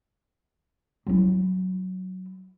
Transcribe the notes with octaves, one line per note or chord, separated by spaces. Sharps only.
F#3 E4